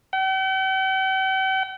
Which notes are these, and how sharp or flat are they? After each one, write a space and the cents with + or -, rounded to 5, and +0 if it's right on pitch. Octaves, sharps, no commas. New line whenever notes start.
G5 -45